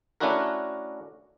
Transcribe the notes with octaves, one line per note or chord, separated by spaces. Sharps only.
A3 C#4 D4 E4 F#4 A#4